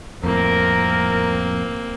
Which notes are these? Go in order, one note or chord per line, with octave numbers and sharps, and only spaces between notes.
F2 A2 A#3 C4 A#4